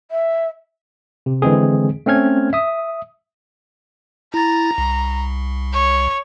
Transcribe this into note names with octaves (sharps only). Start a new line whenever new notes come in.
E5
C3
D3 E3 G#3 C4 G#4
A3 C4 C#4 F6 G#6
E5 D#6
E4 A#5 A6
C2
C#5